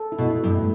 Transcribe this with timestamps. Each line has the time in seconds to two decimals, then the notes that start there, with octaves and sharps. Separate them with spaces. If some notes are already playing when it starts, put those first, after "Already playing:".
Already playing: A4
0.12 E4
0.18 B2
0.30 E4
0.44 G2
0.49 A3